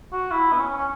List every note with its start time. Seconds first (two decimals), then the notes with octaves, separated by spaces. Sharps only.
0.13 F#4
0.31 E4
0.52 B3
0.59 C#4
0.78 C#4